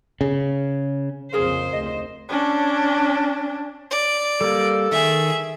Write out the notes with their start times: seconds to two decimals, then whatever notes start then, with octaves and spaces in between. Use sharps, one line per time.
0.21 C#3
1.33 A#1 F2 C#3 G#4 A#4 C5 F5
1.73 F1 D2 D#5
2.29 C#4 D4
3.91 D5
4.41 G3 A#3 A4
4.92 D#3 G#4 E5